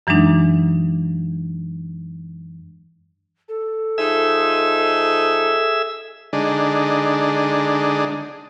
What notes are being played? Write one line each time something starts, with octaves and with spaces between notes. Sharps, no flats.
F#2 E3 F#3 G#3 D4 D#4
A4
F3 D#4 G#4 E5 E6
D3 G#3 D4 D#4